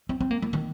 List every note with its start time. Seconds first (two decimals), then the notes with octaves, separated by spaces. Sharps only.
0.09 C4
0.21 C4
0.31 A#3
0.42 A#3
0.53 D#3